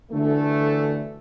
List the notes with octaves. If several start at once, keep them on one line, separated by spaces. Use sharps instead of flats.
D2 D3 E3 A3